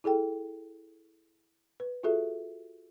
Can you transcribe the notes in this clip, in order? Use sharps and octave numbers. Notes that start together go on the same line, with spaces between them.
E4 G#4 A4 G5
B4
F4 F#4 G#4 A4 E5